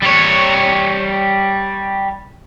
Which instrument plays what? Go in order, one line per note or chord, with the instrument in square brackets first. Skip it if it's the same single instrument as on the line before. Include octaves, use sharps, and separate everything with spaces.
[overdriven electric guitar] G3 C#5